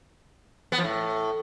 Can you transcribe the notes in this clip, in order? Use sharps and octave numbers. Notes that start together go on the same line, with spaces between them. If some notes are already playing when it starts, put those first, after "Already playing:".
B3
F3
A2